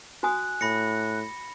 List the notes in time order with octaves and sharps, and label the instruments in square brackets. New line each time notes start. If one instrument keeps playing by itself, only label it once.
[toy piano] F#4 G#5 D#6 [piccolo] F#6
[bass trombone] A2 [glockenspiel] B5 A#6 C#7